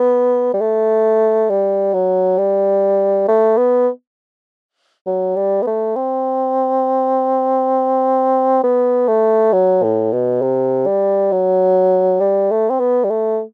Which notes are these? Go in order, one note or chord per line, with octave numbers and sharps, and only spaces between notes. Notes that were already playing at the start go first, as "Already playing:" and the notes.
Already playing: B3
G3
A3
G3
F#3
G3
A3
B3
F#3
G3
B3
A3
C4
B3
A3
F#3
A2
B2
C3
G3
F#3
G3
A3
C4
B3
G3
A3